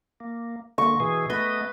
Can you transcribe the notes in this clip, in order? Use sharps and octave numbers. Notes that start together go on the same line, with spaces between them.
A#3
D3 A#3 C#6
B2 E3 G#4
A3 B3 B4 D#5